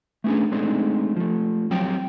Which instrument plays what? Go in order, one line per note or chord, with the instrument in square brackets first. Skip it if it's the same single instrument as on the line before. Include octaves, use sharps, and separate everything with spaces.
[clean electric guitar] A3 B3 C#4 D4 G#4
G#3 A3 C4 D4 D#4 G#4
F3 A3
F2 F#3 G3 C4 G5